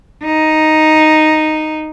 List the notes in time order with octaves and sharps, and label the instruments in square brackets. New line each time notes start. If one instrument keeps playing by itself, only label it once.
[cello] D#4